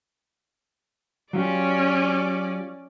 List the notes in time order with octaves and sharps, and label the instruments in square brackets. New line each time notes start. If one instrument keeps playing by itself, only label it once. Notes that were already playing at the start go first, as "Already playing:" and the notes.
[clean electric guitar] F#3 F4 G4 [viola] C#4 D5